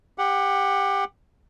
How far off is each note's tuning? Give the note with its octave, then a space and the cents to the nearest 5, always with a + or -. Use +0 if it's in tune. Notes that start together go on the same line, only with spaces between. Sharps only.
G4 +20 F#5 +0